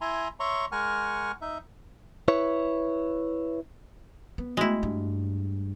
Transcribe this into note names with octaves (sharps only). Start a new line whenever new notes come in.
E4 E5 G#5 A#5 C6
C#5 E5 A#5 C6 C#6
G#3 A#4 F#5 G#5 C#6 F6
D#4 E5
E4 B4 C#5
B3
G#3 A3 E4 F#4
G2